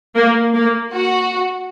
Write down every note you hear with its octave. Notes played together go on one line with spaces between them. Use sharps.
A#3
A#3
F#4